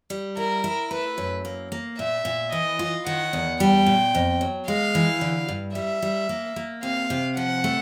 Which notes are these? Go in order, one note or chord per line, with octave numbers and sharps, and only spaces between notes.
G3
E4 A#4
E4
A3 B4
F#2
A#3
A#3
A#2 E5
A#2
E3 D#5
F4
D#3 F#5
E2
G3 G5
A#2
F2
F#3
G#3 F5
E3
D3
G2
G3 E5
G3
A#3
A#3
C3 F5
C3
F3 F#5
A3